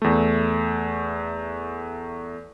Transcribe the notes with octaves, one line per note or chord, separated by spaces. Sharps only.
E2 A3